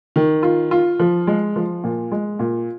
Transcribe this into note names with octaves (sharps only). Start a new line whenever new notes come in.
D#3
F4
F4
F3
G#3
F3
A#2
G#3
A#2